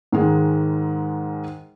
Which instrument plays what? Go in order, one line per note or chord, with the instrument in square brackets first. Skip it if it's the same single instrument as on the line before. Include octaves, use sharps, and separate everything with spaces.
[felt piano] G#2 D#3 G#3